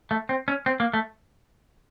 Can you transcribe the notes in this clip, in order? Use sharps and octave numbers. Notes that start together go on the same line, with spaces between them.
A3
C4
C#4
C4
A#3
A3